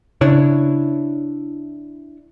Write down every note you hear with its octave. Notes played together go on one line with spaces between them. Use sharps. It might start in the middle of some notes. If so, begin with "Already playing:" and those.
C#3 D4 E4 C#5